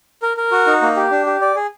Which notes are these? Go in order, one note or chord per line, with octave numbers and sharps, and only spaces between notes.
A#4
A#4
F#4
D#4
A#3
G4
D4
G4
D5
G#4